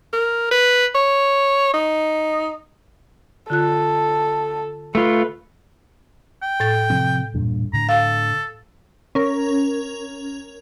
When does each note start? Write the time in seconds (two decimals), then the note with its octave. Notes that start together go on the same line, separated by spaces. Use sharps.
0.13 A#4
0.51 B4
0.95 C#5
1.74 D#4
3.50 D3 F4 A4 F#6
4.95 A3 F4 B4
6.42 G5
6.60 A2 A6
6.90 C3 F3 C4
7.34 E2 G2 A#2
7.73 A2 D3 A#5
7.89 A4 F5
9.15 C#4 A#4